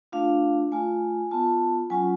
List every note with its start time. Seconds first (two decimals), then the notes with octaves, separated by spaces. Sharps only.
0.12 A3 D4 F4 F5
0.72 A3 F4 G#5
1.31 B3 F4 A5
1.90 F#3 C#4 F4 G#5